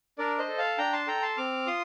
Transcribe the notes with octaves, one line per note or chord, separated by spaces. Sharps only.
D4 A#4 D5
C5 D#5
A4
F5 A5
D4 G5 A#5
A5 C6
A4 G5 A#5
A5 C6
C4 D6 F6
F4 C6 D#6